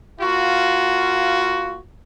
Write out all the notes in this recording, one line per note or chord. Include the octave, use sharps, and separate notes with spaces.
A#3 F4 F#4